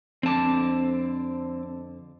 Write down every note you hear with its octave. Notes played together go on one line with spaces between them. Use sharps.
F2 D3 C4 A5 D6